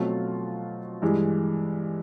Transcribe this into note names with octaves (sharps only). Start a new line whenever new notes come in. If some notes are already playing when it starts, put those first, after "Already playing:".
Already playing: B2 F#3 A3 C4 F4
G2 E3 G#3